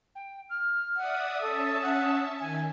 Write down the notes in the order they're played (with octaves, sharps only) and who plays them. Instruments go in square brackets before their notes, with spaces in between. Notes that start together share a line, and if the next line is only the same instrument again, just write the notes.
[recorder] G5
F6
[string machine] D5 E5 D#6 [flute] F#5
[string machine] C#4 E5 A5 [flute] A4 [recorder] D#6
[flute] F#5
[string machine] D#3 [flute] G#5